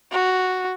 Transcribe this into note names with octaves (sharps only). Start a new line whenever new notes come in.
F#4